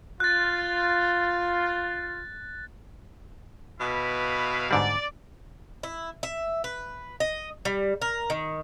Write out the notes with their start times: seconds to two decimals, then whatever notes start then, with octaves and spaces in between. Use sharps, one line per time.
0.20 F4 F#6 A6
3.80 B2 E4 B4 F5
4.71 G#2 D3 G3 D5
5.83 E4
6.23 E5
6.64 B4
7.20 D#5
7.65 G3
8.02 A#4
8.30 D#3